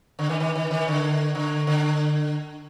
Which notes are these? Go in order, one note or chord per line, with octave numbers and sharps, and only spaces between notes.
D3
D#3
D#3
D#3
D#3
D3
D3
D3